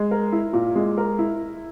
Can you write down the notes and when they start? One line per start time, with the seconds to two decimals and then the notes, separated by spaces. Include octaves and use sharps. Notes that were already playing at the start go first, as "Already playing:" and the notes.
Already playing: G#3
0.11 A#4
0.32 E4
0.53 A#2
0.76 G#3
0.98 A#4
1.19 E4